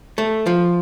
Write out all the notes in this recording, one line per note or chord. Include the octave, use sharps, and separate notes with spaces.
A3
F3